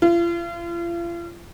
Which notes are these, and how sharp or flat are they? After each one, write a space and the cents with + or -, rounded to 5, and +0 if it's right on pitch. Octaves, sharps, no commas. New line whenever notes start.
F4 -40